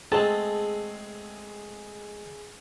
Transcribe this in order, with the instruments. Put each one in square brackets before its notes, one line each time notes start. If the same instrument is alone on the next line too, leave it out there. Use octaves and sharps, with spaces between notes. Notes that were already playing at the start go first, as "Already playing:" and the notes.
[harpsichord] G#3 A3 C4 [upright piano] G#4 [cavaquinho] A5